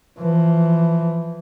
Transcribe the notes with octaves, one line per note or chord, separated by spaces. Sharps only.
E3 F3